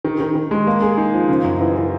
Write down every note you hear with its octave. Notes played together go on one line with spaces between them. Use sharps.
D#3
D#3
D#3
G#3
A#3
G#4
D#4
F3
C#3
F#2
E3
E3